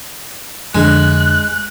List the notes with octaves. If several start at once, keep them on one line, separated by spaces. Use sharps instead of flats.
F2 D3 G#3 F#6